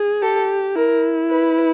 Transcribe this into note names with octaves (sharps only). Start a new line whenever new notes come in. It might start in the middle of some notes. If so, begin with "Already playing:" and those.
Already playing: G#4
G4 A4
E4 A#4
B4